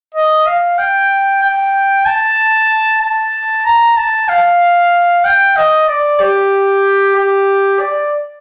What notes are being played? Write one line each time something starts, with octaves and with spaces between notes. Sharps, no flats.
D#5
F5
G5
G5
A5
A5
A#5
A5
F5
G5
D#5
D5
G4
G4
D5